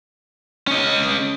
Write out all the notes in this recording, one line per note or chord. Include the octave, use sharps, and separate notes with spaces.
C#4 D#5